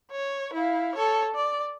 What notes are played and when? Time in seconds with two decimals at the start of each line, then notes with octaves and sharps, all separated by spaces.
0.11 C#5
0.53 E4 F5
0.95 A4 C#5
1.35 D5